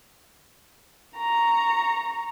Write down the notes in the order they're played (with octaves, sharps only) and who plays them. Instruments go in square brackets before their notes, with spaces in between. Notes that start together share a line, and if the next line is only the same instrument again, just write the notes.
[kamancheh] A#5 C#6